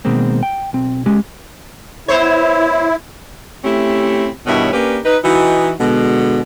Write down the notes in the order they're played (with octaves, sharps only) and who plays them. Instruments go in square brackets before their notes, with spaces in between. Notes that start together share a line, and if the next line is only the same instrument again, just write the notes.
[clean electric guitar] B2 D#3 G#3 A#3 C4
G5
B1 C4
G#3 C#4 G4
[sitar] B3 C5 C#5 [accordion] E4
[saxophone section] A3 C4 C#4 E4 G4
G2 B2 D#3 E4 C#5
A#3 C#4 D4 G4 A#4 B4
D#4 B4
E3 D#4 F#4
B2 D3 G#3